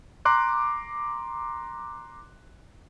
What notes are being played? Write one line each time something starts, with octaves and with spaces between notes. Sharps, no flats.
A#5 C6 D6 F#6